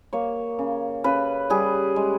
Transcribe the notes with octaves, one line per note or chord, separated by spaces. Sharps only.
A#3 C#5
C#3
C#3 B4
G3 G#4
G#3